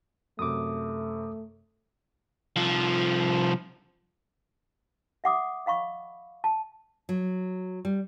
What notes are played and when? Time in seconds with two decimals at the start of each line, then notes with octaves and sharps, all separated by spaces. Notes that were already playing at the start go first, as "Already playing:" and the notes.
0.39 F#2 C3 A3 D6 D#6
2.56 C2 F3
5.24 E5 F#5 D6 D#6
5.66 D#5 F5 B5 C#6
6.44 A5
7.09 F#3
7.85 G3